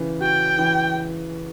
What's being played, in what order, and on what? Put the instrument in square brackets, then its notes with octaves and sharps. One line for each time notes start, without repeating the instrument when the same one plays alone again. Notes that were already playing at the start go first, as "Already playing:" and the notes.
Already playing: [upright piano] C#3 E3
[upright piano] F#4 [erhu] G5
[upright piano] E3